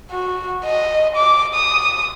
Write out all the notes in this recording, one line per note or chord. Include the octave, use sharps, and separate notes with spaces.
F#4
D#5
D6
D#6